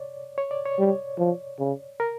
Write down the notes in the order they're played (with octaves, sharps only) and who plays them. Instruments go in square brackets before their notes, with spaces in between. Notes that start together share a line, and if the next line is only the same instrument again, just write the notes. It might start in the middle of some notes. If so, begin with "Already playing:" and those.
Already playing: [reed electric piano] C#5 D5
C#5
D5
C#5
[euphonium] G3
F3
C#3
[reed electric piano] A#4